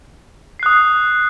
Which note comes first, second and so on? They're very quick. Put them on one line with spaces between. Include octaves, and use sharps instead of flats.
C7 F#6 D#6